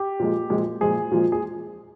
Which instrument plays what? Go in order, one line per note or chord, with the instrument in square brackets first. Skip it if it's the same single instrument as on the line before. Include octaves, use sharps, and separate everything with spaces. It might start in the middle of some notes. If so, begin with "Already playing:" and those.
Already playing: [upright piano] G4
A#2 F3 G#3
A#2 F3 G#3
A#2 F3 G#3 G#4
A#2 F3 G#3
G#4